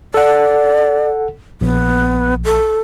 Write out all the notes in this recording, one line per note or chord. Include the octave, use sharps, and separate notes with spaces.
A4 D5 F#5
A#1 B3
A4